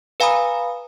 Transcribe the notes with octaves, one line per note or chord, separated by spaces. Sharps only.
B4 F5 G#5 A#5 B5 D#6